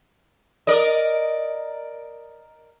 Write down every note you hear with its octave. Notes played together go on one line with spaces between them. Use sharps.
A#4 D5 D#5